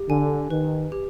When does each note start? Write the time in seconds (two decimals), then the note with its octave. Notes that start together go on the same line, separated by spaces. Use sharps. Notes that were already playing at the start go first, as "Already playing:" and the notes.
Already playing: G4
0.09 D3 G#5
0.50 D#3 B4
0.92 G4